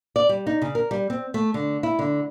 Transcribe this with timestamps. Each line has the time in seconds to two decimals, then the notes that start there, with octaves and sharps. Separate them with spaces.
0.16 D5
0.29 G3
0.47 D#4
0.62 C#3
0.75 A#4
0.91 G3
1.10 C4
1.34 A3
1.54 D3
1.83 E4
1.99 D3